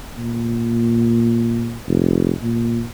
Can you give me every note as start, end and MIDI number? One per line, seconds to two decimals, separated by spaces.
0.17 1.77 46
1.87 2.32 29
2.42 2.83 46